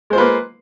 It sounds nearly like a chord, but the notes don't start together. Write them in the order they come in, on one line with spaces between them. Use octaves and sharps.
G#3 C5 F4 B4 A#3